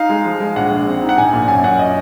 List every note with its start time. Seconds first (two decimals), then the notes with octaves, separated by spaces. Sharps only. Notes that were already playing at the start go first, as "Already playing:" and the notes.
Already playing: D#4 F5
0.09 G#3
0.25 F3
0.40 G#3
0.56 A#1 F#5
0.71 A#1
0.87 C4
1.02 D#4
1.09 F#5
1.17 A#1 G#5
1.33 A#2
1.48 F#2 G#5
1.64 F#2 F#5
1.79 D#5